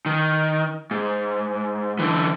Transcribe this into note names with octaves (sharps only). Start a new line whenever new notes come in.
D#3
G#2
D3 E3